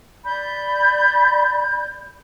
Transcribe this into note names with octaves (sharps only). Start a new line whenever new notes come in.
D5 B5 G6